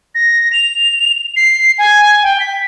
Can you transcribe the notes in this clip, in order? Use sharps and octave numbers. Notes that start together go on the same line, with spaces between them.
A#6
F7
C7
G#5
G5
B6